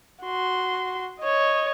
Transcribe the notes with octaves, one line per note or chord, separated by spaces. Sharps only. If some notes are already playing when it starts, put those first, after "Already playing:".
F#4 C6
C#5 D#5